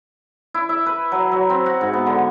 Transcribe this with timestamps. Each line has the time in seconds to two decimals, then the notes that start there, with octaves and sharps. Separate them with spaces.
0.54 E4
0.69 E5
0.86 B4
1.12 F#3
1.32 F#3
1.50 C4
1.66 F#4
1.81 G#2
1.93 B3
2.06 D3